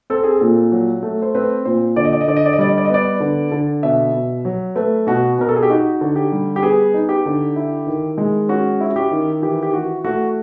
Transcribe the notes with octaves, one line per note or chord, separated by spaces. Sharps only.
C4 A4
G#4
A#2 A4
F#3
A3
C5
C4 B4
A#2 C5
D3 D5
D#5
D5
D#5
D3 D5
D#5
D5
D#5
G3 D5
D#5
D5
D#5
B3 D5
D3
D3
B2 E5
B2
F#3
A3 B4
B2 F#4
B2 A#4
A4
G#4
G4
D#4 F#4
D3
G4
G3
G4
B3 G#4
D#4
G4
D3
E4
D#3
G#3
C#4 F#4
E4
F#4
G4
D#3
E3 G4
G4
E3 F#4
A3 F#4